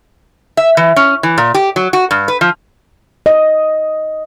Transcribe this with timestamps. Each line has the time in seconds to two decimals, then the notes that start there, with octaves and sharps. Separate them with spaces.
0.57 E5
0.77 E3
0.96 C#4
1.23 E3
1.38 A#2
1.54 G4
1.76 F#3
1.93 F#4
2.11 G2
2.28 B4
2.41 F3
3.26 D#5